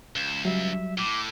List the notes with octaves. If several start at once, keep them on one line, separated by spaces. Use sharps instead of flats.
C#2 E7
F#3 G3 E5
A2 D6